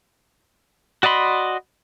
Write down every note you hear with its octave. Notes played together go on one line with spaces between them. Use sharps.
F#4 D5 D#5 B5 C6